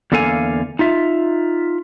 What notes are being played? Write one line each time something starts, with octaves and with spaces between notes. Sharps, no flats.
E2 D3 A#3 A4 F5 G#5
D#4 F4 E5